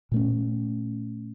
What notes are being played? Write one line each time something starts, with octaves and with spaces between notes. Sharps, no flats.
A#2 A3 C#4